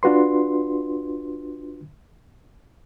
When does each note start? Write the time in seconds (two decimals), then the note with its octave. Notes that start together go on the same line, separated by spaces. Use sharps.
0.03 D4 F4 F#4 B4 C6